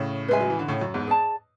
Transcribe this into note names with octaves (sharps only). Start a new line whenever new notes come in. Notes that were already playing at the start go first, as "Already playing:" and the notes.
Already playing: A2 C#3
G#3 B4 E5 G#5
F#3
E3
D3
A2 C#3
F#2
E2 G#2
G#4 D5 A5